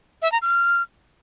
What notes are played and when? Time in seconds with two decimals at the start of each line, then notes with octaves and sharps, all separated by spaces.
0.22 E5
0.32 A#5
0.42 F6